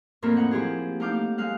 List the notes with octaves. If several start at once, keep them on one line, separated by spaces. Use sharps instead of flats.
F2 A2 A#3 C4 A#4 E6
D#4 F#5
F3 E4 G4 G#4
A3 D#4 F5 D6 G6
G#3 F5 F#6